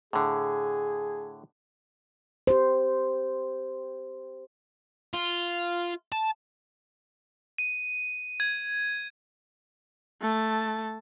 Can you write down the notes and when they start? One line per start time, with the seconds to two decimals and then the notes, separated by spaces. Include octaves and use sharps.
0.13 A2 D3 G#4
2.47 G4 C5
5.13 F4
6.12 A5
7.58 D#7
8.40 G#6
10.22 A3 A5